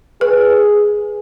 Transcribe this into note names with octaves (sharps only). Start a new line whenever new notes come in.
G#4 B4